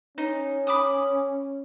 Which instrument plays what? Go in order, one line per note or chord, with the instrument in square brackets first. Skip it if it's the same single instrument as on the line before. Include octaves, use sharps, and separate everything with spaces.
[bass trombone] C#4 [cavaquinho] D#4
[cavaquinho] B5 D6 D#6